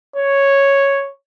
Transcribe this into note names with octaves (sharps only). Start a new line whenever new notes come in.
C#5